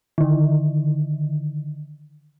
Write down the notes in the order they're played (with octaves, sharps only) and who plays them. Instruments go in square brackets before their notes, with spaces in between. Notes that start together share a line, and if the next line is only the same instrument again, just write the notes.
[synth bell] D3 D#3